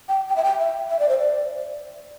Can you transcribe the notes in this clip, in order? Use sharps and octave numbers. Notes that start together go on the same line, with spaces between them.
G5
G5
E5
G5
E5
E5
D5
C5
D5